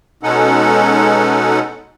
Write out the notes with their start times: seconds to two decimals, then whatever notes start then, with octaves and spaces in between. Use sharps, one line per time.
0.23 B2 G#3 C#4 D#4 A4 F#5